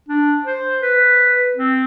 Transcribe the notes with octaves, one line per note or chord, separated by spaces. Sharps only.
D4
C5
B4
C4